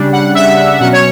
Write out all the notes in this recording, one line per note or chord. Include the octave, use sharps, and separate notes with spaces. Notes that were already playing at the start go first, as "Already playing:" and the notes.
Already playing: C#3 G3 D4
F#5
E5
B2 F#3 C#4 F#5
C#5